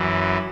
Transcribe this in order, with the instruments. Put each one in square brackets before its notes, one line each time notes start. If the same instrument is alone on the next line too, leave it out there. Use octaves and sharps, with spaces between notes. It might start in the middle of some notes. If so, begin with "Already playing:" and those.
Already playing: [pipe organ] F#2 E3